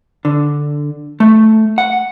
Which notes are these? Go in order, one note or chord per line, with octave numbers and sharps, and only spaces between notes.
D3
A3
F#5